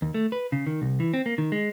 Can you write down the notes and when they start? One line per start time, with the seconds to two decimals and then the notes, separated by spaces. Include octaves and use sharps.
0.02 D#2
0.14 A3
0.32 B4
0.52 C#3
0.67 D#3
0.82 C2
1.00 E3
1.14 C4
1.26 A#3
1.38 D#3
1.52 G#3